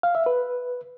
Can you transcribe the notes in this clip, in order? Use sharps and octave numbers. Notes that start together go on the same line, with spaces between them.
F5
E5
B4